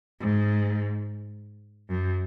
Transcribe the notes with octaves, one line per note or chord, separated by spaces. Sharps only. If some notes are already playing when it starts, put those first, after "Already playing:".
G#2
F#2